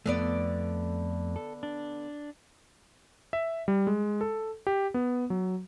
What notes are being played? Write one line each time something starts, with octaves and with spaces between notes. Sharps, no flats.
F2 D3 A3 B3 D5
A4
D4
E5
G3
G#3
A4
G4
B3
F#3